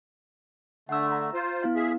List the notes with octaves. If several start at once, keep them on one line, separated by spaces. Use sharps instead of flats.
D3 A3 F#5 E6
A#5
F4 C5
B3 E4 F5
G#4 E5